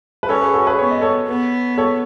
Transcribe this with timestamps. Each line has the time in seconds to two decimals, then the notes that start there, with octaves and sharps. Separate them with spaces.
0.23 B4
0.29 C#4 A4 C#5
0.41 G#4 B4
0.54 F#4 A4
0.67 G#4 B4
0.78 B3 C#5
0.91 D#5
1.01 A4 C#5
1.28 B3
1.78 A4 C#5